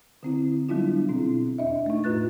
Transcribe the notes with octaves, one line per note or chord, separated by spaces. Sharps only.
D3 C4 E4
F#3 G3 B3 D4 E4 F4
B2 C4 E4
E2 D4 D#5 E5
A3 D#4
A2 F4 B4 F#6 A6